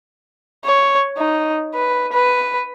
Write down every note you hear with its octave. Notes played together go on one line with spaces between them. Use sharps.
C#5
D#4
B4
B4